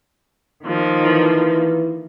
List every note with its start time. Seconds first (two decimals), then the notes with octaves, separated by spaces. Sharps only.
0.63 D#3 F3 A#3
1.03 E3